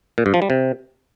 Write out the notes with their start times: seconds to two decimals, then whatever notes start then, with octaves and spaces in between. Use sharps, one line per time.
0.18 A#2
0.26 G2
0.34 F3
0.42 G3
0.50 C3